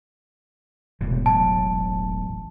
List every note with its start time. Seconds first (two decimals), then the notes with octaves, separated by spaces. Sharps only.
1.01 E1 A2 C3 E3
1.26 A1 F#3 A5